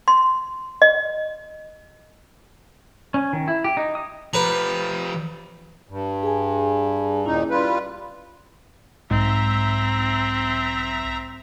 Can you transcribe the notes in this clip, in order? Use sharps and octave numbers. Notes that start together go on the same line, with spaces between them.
C6
D#5
C#4
D#3
E4
G4
D#4
D#6
F3 G4 B4 A#5
G2
G#4 G#5
D#2 A#2 C#4 D#4 E4
G3 F4 B4
B1 G#2 C4 E5 A#5